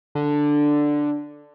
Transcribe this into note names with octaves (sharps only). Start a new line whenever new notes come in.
D3